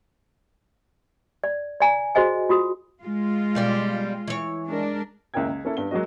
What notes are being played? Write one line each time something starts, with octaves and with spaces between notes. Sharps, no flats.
D5
D5 G#5 A#5
F#4 G#4 C5 D#5 G#5
F4 F#4 D#6
G#3 F4
B2 G3 D5
E3 C#5
G#3 D4 A#4
F#1 C#2 E4 A#4 G5 G#6
C#2
A#3 C#4 E4 A4
G2 B3 G7
F#3 G#3 A#3 F#4 D#5